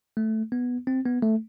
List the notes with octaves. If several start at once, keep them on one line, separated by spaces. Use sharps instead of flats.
A3
B3
C4
B3
A3